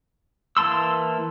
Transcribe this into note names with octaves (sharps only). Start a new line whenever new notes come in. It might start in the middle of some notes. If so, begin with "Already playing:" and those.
E3 A#3 A5 C6 E6